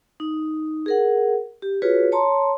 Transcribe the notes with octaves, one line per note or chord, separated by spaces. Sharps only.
D#4
G#4 A#4 F#5
G4
F4 F#4 G#4 B4 C#5
C#5 A5 A#5 C6